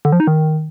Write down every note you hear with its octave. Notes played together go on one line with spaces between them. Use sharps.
D3
F3
D#4
D#3